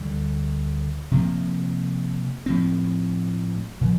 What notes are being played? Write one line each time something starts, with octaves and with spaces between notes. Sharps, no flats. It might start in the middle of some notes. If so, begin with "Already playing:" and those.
Already playing: D2 D3 G3
C3 F3 A#3
A2 F3 C4
A#2 F3